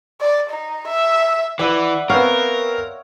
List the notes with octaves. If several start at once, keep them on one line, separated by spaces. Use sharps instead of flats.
D5
D#4
E5
E3 B4 D5 E5 F#5 B5
B3 C4 A#4 C#5 F5 F#5